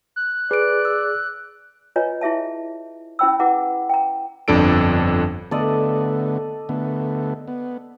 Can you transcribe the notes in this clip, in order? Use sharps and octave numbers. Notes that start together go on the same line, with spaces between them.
F#6
G#4 B4 D5 D7
E6
F4 B4 C#5 D#5 G#5 A#5
E4 G#4 E5 A5
C#4 E4 C5 G5 B5 E6
E4 G#4 B4 F#5 A#5 D6
G5 A#5
G1 F2 D4 A4 D7
D3 A3 B3 A4 D5 D#5
D3 A3 B3
B3